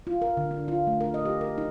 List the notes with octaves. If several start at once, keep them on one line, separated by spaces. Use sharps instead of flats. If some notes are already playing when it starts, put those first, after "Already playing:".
F4
A#4
D3
D4
F4
A3
A#4
D#5
G4
A#4
D#4